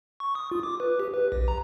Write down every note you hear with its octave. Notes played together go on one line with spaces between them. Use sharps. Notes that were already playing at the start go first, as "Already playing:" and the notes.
C#6
D#6
F4
D6
B4
G4
B4
A#1
A#5